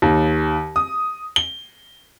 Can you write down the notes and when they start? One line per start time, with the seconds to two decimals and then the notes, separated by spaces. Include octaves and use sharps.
0.02 D#2
0.76 D#6
1.36 G7